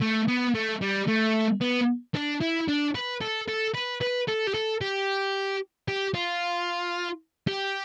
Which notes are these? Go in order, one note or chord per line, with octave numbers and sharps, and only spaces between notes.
A3
B3
A3
G3
A3
B3
D4
E4
D4
B4
A4
A4
B4
B4
A4
G4
A4
G4
G4
F4
G4